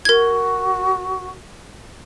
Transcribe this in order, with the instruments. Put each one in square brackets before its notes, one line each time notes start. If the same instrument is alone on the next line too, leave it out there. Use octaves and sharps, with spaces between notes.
[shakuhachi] F#4 [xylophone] A#4 G#6